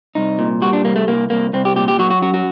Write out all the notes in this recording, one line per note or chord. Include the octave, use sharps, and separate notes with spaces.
C2 D#4
A#2
G3 F#4
D4
C2 A#3
A3
C2 A#3
C2 A#3
C2 C4
G4
A#2 G4
G4
F#3 F#4
F#4
F#2 F#4
F#4